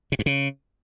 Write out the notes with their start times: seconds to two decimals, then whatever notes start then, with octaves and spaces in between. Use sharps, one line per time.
0.12 C3
0.19 G2
0.26 C#3